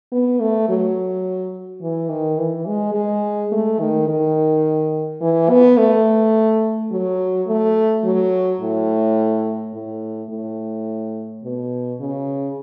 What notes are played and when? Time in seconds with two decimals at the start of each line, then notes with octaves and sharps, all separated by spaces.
0.12 B3
0.40 A3
0.69 F#3
1.81 E3
2.09 D#3
2.38 E3
2.67 G#3
2.94 G#3
3.52 A3
3.80 D#3
4.08 D#3
5.21 E3
5.50 B3
5.77 A3
6.91 F#3
7.47 A3
8.04 F#3
8.61 A2
9.73 A2
10.30 A2
11.44 B2
12.00 C#3